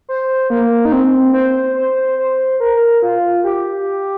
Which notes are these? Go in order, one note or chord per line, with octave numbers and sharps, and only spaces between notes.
C5
A#3
D#4
C4
C5
C5
C5
A#4
F4
G4